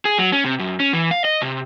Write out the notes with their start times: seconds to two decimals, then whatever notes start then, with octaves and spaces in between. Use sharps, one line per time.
0.05 G#4
0.19 F#3
0.32 C#4
0.44 C3
0.59 F#2
0.80 C#4
0.93 E3
1.11 F5
1.25 D#5
1.42 C3